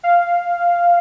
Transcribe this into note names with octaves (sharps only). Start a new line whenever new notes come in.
F5